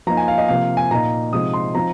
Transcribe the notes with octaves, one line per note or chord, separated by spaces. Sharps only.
F3 A#3 D#4 A#5
G#5
F5
D#5
C3 F3 A#3 F5
G#5
A#2 A#3 D#4 A#5
C3 F3 G#3 C4 D#4 D#6
C6
F3 C4 D#4 A#5